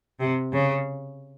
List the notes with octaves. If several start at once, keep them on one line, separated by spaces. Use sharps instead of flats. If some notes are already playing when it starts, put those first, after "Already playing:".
C3
C#3